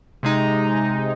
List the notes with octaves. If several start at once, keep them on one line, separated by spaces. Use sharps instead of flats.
C3 G#3 D#4